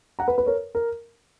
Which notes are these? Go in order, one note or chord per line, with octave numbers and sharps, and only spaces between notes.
F#5 A#5
B4
B4
A#4 C#5
A#4